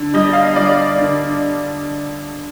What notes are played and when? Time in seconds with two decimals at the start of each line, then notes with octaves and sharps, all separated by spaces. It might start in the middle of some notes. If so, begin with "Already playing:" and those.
Already playing: D3
0.14 G3 D#5
0.33 F5
0.45 D#5
0.56 G3 D5
0.98 D3